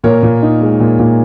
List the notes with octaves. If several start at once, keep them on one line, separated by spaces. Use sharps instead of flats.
A#2 A#4 C#5
A#2
D#4
G#3
A#2
A#2